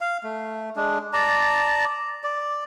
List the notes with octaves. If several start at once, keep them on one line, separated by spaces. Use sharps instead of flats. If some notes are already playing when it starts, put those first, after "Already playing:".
F5
A3
G#3 D4
D5 A5 A#5
D5